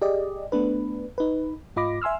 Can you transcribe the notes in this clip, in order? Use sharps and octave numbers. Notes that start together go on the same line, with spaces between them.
G4 G#4 D5 D#5
A3 B3 D4 B4
D#4 B4
G#2 F4 D#5 B5 D6 A#6
E5 G#5 C6 E6 F6